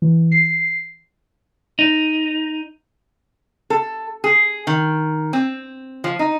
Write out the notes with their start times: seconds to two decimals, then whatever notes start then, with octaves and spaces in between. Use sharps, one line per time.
0.02 E3
0.32 C7
1.79 D#4
3.70 A4
4.24 G#4
4.67 D#3
5.33 C4
6.04 F3
6.19 D#4